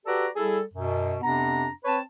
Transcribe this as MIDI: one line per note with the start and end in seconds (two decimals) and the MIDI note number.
0.06 0.28 66
0.06 0.28 67
0.06 0.28 69
0.06 0.28 71
0.06 0.28 74
0.06 0.28 82
0.36 0.61 55
0.36 0.61 64
0.36 0.61 68
0.36 0.61 69
0.74 1.16 42
0.74 1.16 47
1.22 1.68 41
1.22 1.68 48
1.22 1.68 59
1.22 1.68 62
1.22 1.68 82
1.85 2.00 60
1.85 2.00 71
1.85 2.00 73
1.85 2.00 81